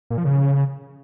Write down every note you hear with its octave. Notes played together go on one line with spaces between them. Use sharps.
A#2
F3
C#3